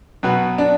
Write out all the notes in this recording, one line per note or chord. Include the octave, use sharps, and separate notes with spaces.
B2 F#3 B3 F#4 B4
D4